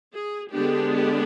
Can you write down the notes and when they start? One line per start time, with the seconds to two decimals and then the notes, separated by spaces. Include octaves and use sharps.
0.14 G#4
0.53 D3 G#3 B3 D4 G4
0.94 G4